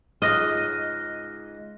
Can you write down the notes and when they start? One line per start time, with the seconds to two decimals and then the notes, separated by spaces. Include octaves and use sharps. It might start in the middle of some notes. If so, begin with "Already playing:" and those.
0.22 C#2 G#2 D#5 F6 F#6 A#6